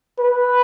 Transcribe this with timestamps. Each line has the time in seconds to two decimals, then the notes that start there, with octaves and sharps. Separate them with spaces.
0.19 B4